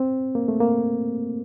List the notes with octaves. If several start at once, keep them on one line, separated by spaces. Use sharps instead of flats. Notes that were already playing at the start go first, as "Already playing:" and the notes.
Already playing: C4
A#3
A3
A#3